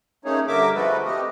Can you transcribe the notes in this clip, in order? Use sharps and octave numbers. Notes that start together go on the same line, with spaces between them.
A3 A#3 C#4 D#4 G#4 C#5
G2 D3 A#4 E5 D6
F3 G#3 A3 F#4 A4 B4
C3 A3 G4 D#5